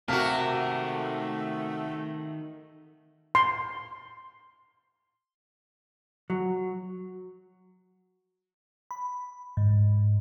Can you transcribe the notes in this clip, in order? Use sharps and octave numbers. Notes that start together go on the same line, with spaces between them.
C3 D#3 A3 A#3 F#4 A5 F6 B6
C6
F#3
B5
G#2